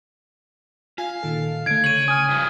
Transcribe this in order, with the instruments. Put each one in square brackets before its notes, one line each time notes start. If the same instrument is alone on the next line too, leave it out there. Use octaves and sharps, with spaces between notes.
[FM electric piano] F4 G#5 [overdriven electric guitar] F5
[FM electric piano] A#2 D#3 A4
[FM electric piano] D3 A3 [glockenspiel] G#6 D7
[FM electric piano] C#3 [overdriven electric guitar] C#5 [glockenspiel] D#7 F#7
[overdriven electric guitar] G#5 [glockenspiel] D#6 F6
[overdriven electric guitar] G2 F3